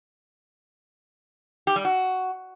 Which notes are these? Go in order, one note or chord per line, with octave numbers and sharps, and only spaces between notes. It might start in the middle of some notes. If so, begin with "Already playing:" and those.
G4
G3
F#4